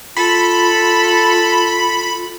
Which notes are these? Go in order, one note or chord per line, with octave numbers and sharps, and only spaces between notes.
F4 A4 B5